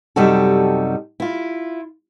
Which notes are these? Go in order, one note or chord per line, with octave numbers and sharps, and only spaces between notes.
F#2 C3 G3 D#4 F#4 A4
E4 F4